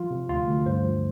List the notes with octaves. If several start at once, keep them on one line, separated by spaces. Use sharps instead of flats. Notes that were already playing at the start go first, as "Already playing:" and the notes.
Already playing: F3 F4
C3
D2 F4
D2
G2 C5
F3